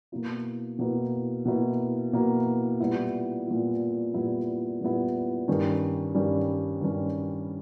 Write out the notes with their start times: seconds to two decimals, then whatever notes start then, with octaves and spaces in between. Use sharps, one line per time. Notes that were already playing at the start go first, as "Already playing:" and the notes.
0.12 B2 A#3 E4
0.79 B2 A#3 E4
1.45 B2 A#3 E4
2.13 B2 A#3 E4
2.80 A#2 G3 B3 E4
3.47 A#2 G3 B3 E4
4.14 A#2 G3 B3 E4
4.81 A#2 G3 B3 E4
5.48 G2 D#3 G3 C#4
6.15 G2 D#3 G3 C#4
6.81 G2 D#3 G3 C#4